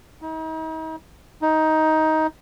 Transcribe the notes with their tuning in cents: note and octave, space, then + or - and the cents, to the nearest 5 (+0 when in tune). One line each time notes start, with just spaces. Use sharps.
D#4 +40
D#4 +15